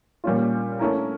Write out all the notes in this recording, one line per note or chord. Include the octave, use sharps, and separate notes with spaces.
A#2 G3 C#4 F4
A3 C#4 E4 A#4